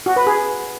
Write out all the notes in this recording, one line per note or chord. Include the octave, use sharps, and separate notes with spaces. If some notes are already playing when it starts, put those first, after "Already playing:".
F#4
B4
G#4